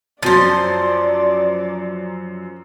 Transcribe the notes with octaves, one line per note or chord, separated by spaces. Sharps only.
F#2 F3 F#3 C5 D5 A6